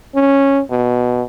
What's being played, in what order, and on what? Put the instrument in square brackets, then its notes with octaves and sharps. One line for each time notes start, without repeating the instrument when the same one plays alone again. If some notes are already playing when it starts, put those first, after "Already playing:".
[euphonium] C#4
B2